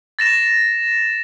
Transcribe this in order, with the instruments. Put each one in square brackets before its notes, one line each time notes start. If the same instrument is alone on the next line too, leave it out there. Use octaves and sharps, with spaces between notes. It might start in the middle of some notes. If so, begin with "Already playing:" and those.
[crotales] A6 A#6 E7